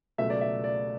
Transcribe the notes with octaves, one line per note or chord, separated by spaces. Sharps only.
C#2 B2 F#3 A3 E5
D5
E5
D5